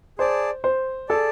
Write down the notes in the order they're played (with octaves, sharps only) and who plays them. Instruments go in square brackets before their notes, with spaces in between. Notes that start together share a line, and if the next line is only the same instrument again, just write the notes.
[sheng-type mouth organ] G#4 D5 A5 [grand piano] C5
[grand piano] C5
[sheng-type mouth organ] G#4 D5 A5 [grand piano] A4